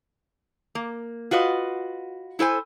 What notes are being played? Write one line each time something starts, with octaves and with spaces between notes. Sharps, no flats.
A#3
F4 F#4 B4 D#5
E4 A4 C5 G#5